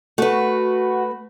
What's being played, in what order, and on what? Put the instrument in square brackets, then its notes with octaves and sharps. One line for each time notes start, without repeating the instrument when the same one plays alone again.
[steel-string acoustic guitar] A3 B4 [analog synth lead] F#4